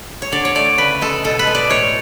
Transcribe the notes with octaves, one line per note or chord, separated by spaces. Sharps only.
C#5
D3 D5
C#5
A3 D5
C#3 B4
G#3 A4
B2 A4
B4
G#3
D5
A2 C#5